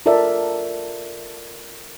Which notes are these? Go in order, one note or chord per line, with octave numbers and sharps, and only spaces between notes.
F4 A4 A#4 D5 E5